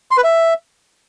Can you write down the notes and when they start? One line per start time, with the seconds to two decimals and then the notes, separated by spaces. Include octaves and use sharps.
0.11 C6
0.17 B4
0.24 E5